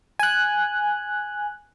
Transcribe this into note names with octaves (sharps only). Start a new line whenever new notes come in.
G#5 F#6